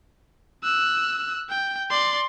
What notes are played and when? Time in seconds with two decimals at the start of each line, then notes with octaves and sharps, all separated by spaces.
0.64 E6 F#6
1.50 G5
1.90 D5 C6